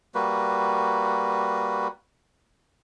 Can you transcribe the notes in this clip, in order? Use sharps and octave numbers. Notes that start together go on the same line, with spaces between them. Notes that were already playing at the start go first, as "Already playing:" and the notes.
G3 A#3 F#4 B4